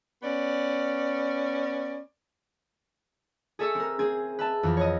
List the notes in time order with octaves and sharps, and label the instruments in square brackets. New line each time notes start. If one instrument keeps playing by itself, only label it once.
[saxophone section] B3 C#4 D5
[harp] G#4 A4 E5 C#6 E6
C4 A#4
C4 G#4 G#6
B4 E5 A5
F2 E3
C#5 D#5